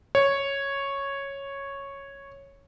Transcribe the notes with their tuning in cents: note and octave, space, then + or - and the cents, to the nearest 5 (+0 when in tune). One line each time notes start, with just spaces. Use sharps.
C#5 -5